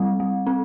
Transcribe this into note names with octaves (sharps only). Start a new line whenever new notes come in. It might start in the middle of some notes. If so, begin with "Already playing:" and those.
Already playing: G3 C4
G3
C4